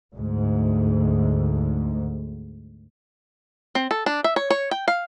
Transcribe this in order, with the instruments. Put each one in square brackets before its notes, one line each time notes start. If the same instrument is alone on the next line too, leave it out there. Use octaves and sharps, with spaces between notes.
[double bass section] D2 G#2
[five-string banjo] C4
A4
D4
E5
C#5
C#5
G5
F5